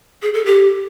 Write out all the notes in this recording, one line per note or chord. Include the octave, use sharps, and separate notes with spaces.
G#4
A4
G4